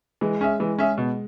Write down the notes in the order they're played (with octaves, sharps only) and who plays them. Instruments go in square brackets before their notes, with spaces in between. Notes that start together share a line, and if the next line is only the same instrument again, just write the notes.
[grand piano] E3 [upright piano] G#3
[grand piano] C#4 G#4 E5
[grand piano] E3 [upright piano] G#3
[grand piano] C#4 G#4 E5
B2